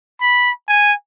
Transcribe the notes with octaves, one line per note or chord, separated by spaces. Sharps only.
B5
G#5